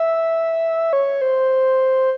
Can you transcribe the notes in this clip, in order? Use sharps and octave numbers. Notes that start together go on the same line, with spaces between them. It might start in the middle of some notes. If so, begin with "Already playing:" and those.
Already playing: E5
C#5
C5